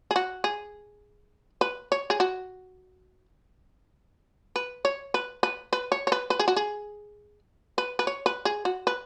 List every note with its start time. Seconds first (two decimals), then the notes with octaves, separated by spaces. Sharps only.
0.11 G#4
0.16 F#4
0.44 G#4
1.61 B4
1.92 C#5
2.10 G#4
2.20 F#4
4.56 B4
4.85 C#5
5.14 B4
5.43 B4
5.73 B4
5.92 C#5
6.07 C#5
6.12 B4
6.30 B4
6.39 G#4
6.48 F#4
6.57 G#4
7.78 B4
7.99 B4
8.07 C#5
8.26 B4
8.45 G#4
8.65 F#4
8.87 B4